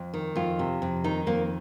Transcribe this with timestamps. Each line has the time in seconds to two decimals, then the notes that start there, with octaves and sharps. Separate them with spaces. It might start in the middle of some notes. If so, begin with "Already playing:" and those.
Already playing: F2
0.14 D#3
0.36 F2 F4
0.59 C3
0.82 F2
1.04 D#3 D#4
1.26 F2 A#3